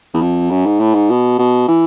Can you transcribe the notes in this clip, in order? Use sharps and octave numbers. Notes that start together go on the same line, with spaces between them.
E2
F2
F#2
G#2
A2
G#2
B2
B2
E3